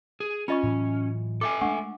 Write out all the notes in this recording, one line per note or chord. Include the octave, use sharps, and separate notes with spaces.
G#4
C#4 F4 D#5 C#6
A2 E3 F#3
A4 E5 G#5 D6
G#3 A3 D4 F#5 C#6